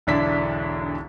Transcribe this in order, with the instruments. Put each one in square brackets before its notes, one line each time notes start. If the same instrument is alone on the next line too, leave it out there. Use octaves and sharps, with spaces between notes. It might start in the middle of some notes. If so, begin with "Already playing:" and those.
[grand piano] E1 B1 D3 D4 E4 B6